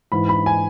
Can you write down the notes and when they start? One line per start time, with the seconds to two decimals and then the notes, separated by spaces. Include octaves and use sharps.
0.12 G#2 E3 B5
0.29 B5
0.46 G#5